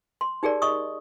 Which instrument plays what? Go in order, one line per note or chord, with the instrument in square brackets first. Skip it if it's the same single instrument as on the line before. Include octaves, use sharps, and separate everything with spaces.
[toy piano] C6
D#4 G4 G#4 A#4 D5
D#5 C#6 D#6